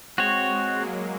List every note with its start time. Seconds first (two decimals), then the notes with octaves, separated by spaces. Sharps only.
0.18 G#3 C4 F#4 C#5
0.49 G#3
0.79 F#3 A#3